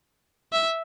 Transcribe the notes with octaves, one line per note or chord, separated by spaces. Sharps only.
E5